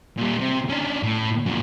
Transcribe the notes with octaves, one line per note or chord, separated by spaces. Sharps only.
A#2 G3
C3
C#4 D4
A2
F#2 A#2